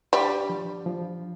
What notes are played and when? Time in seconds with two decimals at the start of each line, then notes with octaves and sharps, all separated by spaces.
0.13 G3 D4
0.49 F3
0.86 F3